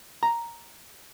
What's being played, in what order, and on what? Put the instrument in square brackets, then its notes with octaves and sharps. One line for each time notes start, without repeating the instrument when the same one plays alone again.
[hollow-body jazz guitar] A#5